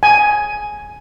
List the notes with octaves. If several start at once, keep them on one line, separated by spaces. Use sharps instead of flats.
G#5